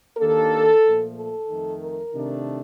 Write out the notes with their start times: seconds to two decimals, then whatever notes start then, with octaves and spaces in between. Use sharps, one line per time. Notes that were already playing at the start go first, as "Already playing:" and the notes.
0.18 D#2 D#3 A#3 D4 A4
0.83 A#2 F3 A3
1.16 A4
1.48 F2 D#3 A3
1.80 A#4
2.13 C3 D#3 A3 D4